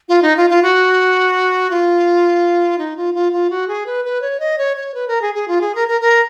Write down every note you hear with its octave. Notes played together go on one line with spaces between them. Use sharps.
F4
D#4
F4
F4
F#4
F4
D#4
F4
F4
F4
F#4
G#4
B4
B4
C#5
D#5
C#5
C#5
B4
A#4
G#4
G#4
F4
G#4
A#4
A#4
A#4